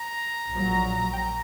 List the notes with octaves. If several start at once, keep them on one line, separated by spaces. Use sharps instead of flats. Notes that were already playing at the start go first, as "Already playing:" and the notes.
Already playing: A#5
A#1 A#2 F#3
G5
A#5